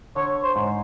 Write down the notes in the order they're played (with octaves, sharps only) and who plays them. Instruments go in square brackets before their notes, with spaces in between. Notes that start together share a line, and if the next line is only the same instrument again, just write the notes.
[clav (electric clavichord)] D3 [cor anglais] C#5
[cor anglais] C5
[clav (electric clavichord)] G#2